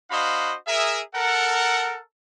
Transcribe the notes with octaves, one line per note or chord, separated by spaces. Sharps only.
D4 F#4 C5 D#5 F5 B5
G#4 A#4 E5
A4 A#4 F#5